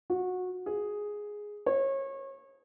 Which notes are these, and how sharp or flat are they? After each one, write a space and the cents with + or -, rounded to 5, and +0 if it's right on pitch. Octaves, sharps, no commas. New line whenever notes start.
F#4 -20
G#4 +0
C#5 -30